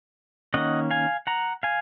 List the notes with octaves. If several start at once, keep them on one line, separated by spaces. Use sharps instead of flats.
D#3 A#3 C#4 D#5 F#5
F5 G#5
F#5 A#5
F5 G#5